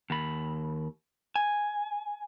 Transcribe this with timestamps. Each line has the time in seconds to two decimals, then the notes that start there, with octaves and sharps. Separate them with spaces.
0.10 D#2 B5
1.36 G#5